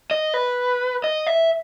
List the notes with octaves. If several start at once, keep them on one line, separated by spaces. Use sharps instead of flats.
D#5
B4
D#5
E5